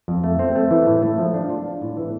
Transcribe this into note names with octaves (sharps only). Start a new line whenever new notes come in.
F2
A3
C4
A3
E3
A2
A3
F3
D4
F4
D4
A2
E3